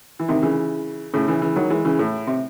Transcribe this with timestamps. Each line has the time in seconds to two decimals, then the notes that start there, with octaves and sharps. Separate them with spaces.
0.19 E3
0.29 C3 D#3
0.43 C#3 E3
1.14 A2 C#3
1.28 C#3 E3
1.42 C#3 E3
1.56 D#3 F#3
1.70 E3 G#3
1.85 C#3 E3
1.99 A2
2.27 C3